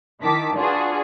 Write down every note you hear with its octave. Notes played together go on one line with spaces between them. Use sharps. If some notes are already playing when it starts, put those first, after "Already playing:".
D#3 E4 A5 D6 B6
D4 F4 F#4 G#4 B4